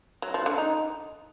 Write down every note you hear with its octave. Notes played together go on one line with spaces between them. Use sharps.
F#3
F3
D3
D#4